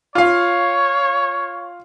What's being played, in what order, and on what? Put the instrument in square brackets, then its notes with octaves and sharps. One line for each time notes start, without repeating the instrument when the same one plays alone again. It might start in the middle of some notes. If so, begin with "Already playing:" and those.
[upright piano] F4 F5 [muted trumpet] C#5